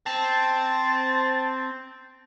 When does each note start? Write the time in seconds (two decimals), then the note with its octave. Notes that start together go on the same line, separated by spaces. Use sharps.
0.06 C4 A5